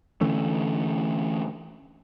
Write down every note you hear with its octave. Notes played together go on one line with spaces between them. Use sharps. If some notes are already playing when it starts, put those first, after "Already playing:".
D3 E3 A3 C#4